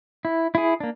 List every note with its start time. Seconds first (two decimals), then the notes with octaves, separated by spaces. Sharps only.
0.25 E4
0.55 E4 G#4
0.80 A#3 D4